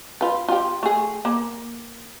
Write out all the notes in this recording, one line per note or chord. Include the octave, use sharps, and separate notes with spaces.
F4 B4
F4 G4
A3 G#4
A#3